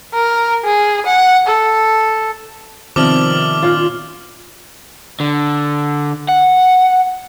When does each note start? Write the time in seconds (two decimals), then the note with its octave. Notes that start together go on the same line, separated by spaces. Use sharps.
0.14 A#4
0.64 G#4
1.06 F#5
1.47 A4
2.96 C3 D#3 F3 B3 D5 D6 F6 F#7
3.62 A#2 C#4 F4
5.20 D3
6.29 F#5